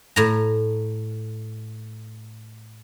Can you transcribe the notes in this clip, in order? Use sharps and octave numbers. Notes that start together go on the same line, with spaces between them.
A2 A#5